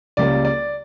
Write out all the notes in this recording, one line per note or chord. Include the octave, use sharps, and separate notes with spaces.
C#2 C#3 G3 A#3 D5
D5